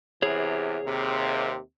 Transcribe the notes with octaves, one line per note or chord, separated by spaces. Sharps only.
E2 C3 E3 G#4 C#5
D#2 C3